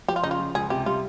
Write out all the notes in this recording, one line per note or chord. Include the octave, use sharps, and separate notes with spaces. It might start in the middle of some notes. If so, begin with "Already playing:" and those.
F3 G4
F4
C#3 D#4
F4
F3
C#2 G#4
C3 G4
G3 F4